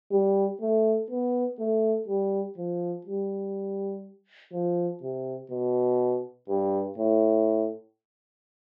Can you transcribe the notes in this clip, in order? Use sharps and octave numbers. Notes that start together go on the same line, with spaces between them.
G3
A3
B3
A3
G3
F3
G3
F3
C3
B2
G2
A2